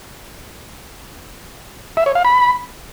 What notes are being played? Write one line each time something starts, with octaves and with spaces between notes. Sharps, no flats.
E5
C#5
F5
B5